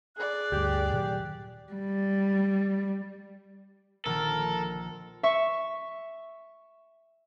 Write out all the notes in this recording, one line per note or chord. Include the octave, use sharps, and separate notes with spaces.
G#4 D5 F#6
D2 G2 G4
A#2 D#3 F#3
G3
A#1 D#3 A4 A#4
E5 C#6